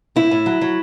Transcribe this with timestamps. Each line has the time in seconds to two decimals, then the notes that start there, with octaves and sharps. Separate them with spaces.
0.16 A2 E4
0.31 A2
0.46 F#3
0.61 F#3